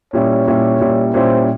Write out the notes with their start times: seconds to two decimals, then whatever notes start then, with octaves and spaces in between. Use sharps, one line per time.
0.13 A#2 G3 C#4 E4 C#5
0.47 A#2 G3 C#4 E4
0.80 A#2 G3 C#4 E4
1.14 A#2 G3 C#4 E4 C5